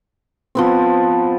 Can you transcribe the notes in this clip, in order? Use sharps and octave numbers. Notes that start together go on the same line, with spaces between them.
F3 B3 C4